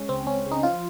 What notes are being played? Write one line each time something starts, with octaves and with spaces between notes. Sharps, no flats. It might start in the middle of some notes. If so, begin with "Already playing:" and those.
Already playing: G#3 C#4
C#2 C4
C#2 C#4
C#3
D#4
F3 F4